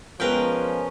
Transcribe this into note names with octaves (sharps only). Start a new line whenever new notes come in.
F3 G#3 B3 C#4 A#4 B4 G5 F#6